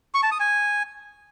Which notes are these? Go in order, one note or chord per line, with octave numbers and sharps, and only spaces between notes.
C#6
A5
D#6
G#5